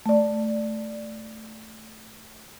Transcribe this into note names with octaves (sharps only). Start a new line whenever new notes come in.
A3 D5